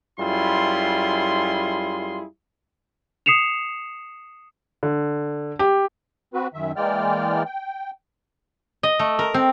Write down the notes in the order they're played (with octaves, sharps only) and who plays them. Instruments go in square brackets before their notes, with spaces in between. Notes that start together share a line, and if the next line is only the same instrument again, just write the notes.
[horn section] F#2 G3 E4 F4 G#4 C6
[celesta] D#6 C7 C#7 E7 F7
[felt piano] D3
G4
[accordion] C4 F#4 B4
F#2 D#3 E5
E3 G#3 A#3 D5 G5 F6
G5
[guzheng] D#5
A3
A#4
C4